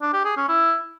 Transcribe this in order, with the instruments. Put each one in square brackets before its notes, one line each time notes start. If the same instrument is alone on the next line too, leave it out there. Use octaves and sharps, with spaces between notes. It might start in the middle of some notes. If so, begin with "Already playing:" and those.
[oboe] D4
G4
G#4
C#4
E4